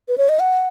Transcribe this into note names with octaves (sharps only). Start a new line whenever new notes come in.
B4
C#5
D#5
F#5